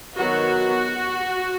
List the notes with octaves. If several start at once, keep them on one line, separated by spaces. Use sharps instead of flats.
D#3 F#3 B3 F#4